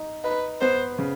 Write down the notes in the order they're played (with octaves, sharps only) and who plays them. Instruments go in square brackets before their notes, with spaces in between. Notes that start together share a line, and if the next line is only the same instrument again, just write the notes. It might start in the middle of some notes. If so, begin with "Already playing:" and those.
Already playing: [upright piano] D#4
[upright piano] D#4 [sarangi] B4
[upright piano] B3 [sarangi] C5
[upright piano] C#3